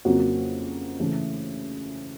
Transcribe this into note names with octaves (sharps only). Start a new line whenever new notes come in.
F2 C#3 F#3 A#3 F#4
C#3 E3 A3